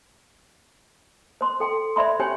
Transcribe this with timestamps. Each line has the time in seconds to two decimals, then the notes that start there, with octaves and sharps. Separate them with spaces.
1.41 C5 C6
1.60 A4 G5 C6
1.96 C5 D5 E5 B5 C6
2.20 C#4 G4 C5 C#5 G5 G#5